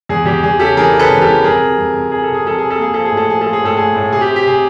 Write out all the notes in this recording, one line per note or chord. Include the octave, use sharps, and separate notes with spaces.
E2 G#4
E2 G4
E2 G#4
C#3 G4 A4
E3 G#4 A#4
C#3
A4 B4
E2
G4 A4
E3
F2 G#4 A#4
C3
F2
F2
F2 G#4
A4
C3
G#4
F2 A4
C3 G#4
A4
A#3 G#4
F3 A4
G#4
A2
A4
F3 G#4
F3 A4
G#4
A2 A4
A2 G#4
A2
C3 G#4
G4
C3
G4
C3 G#4